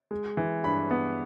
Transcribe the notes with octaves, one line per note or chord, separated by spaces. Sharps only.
G#3
E3
G2 B5
B3